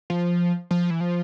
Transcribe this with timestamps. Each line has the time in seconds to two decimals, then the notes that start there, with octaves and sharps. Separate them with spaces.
0.10 F3
0.71 F3
0.90 E3
1.01 F3